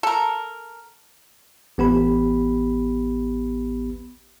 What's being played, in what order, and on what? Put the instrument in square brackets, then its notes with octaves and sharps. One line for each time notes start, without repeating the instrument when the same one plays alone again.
[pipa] A4 A#4
[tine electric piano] A1 B3 G4 B5